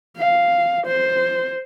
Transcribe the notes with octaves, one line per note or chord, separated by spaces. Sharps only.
F5
C5